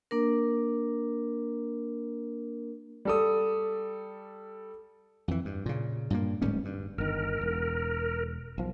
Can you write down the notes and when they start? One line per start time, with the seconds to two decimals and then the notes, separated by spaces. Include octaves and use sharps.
0.11 A#3 D4 A#4
3.05 G3 A4 D#6
5.28 F2 E3
5.45 G2
5.66 A#2 C#3
6.10 G2 A#2 A#3
6.42 D1 G#2 G3 C#4
6.65 G2
6.98 G1 D#3 A#4
7.41 E1
8.58 B1 F3